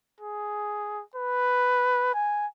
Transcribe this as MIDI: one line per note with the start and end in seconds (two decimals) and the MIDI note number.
0.20 1.03 68
1.15 2.14 71
2.14 2.47 80